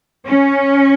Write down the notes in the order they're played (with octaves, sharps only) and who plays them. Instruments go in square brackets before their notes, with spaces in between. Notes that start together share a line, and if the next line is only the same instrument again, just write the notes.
[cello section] C#4